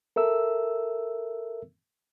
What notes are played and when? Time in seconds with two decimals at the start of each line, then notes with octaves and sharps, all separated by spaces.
0.16 A4 A#4 E5 E6